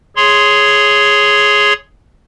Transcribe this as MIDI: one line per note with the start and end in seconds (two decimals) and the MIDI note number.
0.16 1.73 68
0.16 1.73 73
0.16 1.73 84